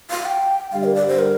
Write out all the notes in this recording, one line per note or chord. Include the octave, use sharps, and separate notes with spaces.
F5
G5
G2 D3 G3 F5
A#4
D5
C5
A#4